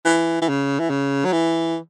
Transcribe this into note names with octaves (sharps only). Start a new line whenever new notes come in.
E3
E3
C#3
E3
C#3
F#3
E3